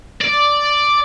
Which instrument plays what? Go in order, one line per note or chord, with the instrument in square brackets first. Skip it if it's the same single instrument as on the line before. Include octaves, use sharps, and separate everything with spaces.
[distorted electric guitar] D5